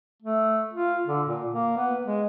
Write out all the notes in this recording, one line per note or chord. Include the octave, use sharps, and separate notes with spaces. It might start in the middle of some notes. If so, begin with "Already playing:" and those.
A3
F4
D3
A#2
A#3
B3
G#3